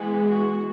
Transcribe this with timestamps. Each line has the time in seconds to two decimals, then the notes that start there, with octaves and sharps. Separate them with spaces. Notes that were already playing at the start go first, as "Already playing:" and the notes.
Already playing: E3 G#3 B3
0.24 F#4